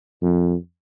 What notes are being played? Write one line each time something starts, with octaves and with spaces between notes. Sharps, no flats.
F2